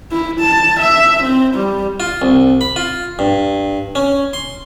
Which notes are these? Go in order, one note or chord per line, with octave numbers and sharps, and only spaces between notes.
E4
A5
E5
C4
G3
F4
C2
B5
F4
G2
C#4
C6